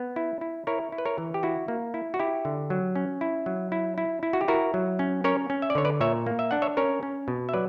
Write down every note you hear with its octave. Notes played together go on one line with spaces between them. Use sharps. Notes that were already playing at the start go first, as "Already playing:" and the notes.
Already playing: B3
E4
E4
E4 A#4 C#5
E4
B4
A#4 C#5
E3
G4
E4 F#4
A#3
E4
F#4
E4 G4
D3
F#3
C#4
E4
F#3
E4
E4
E4
F#4
G4
E4 F#4 A#4
F#3
C#4
C#4 A#4 C#5
C#4
E5
D5
D3 C#5
B4 D5
A#2 C#5 E5
A#3
E5
D4 F#5
C#5 E5
C#4 A#4 C#5
C#4
B2
E5
F#3 B4 D5